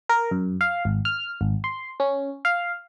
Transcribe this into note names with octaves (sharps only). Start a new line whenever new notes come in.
A#4
F#2
F5
G#1
F6
G#1
C6
C#4
F5